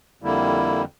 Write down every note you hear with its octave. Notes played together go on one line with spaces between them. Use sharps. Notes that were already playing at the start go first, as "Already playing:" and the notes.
F2 D3 G3 A#3 E4